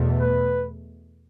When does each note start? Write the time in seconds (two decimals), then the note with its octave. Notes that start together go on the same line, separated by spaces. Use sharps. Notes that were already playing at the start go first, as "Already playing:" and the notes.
Already playing: E2 B2 A3
0.20 B4